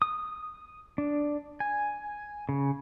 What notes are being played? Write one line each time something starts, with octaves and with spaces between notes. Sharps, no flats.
D#6
D4
G#5
C#3